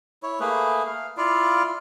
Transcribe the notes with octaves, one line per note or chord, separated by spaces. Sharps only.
E4 C#5
A3 A#3 G#4 B4
F5
E4 F4 D5 F5